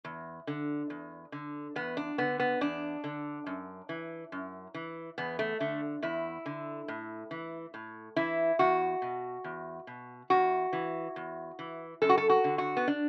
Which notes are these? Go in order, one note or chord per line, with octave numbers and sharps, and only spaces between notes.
E2
D3
E2
D3
E2 B3
D4
D3 B3
B3
E2 D4
D3
F#2
E3
F#2
E3
E2 B3
A3
D3 A3
E2 E4
D3
A2
E3
A2
E3 E4
E2 F#4
B2
E2
B2
E2 F#4
E3
E2
E3
F#2 A4
F#4
A4
F#4
D3
F#4
B3
D4